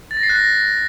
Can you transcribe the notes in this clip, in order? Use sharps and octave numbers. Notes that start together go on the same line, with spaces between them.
A6
A#6
C7
F#6
A#6